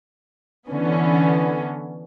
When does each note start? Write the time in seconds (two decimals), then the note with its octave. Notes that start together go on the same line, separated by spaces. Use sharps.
0.68 D3 E3 B3 C#4